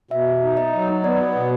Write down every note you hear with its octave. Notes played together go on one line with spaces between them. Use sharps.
B2 E5
D#4
D#5
F#3
B3 D5
B2